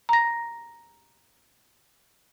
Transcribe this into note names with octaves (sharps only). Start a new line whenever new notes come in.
A#5 A#6